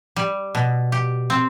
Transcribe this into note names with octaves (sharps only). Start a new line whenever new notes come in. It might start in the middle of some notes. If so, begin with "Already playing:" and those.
G3
B2
G4
C4